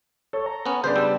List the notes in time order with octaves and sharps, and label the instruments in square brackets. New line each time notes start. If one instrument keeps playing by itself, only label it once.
[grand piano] A4 [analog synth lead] C#5
[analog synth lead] A#5
[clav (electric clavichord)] B3 C#4
[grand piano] C#3 B3 D4 [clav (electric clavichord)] C5 [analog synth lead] C6
[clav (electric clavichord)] G3 [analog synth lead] E6